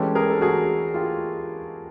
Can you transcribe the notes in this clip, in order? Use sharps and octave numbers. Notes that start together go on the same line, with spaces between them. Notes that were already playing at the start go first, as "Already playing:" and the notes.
Already playing: E3 G#3 C#4 G4 A4
G#4 A#4
A4
F#4 G#4
F4 G4